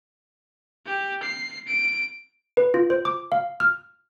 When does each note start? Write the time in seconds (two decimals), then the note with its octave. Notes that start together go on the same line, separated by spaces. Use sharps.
0.87 G4
1.23 C7
1.67 D7
2.57 B4
2.74 F4
2.90 C5
3.05 D6
3.32 F5
3.60 F6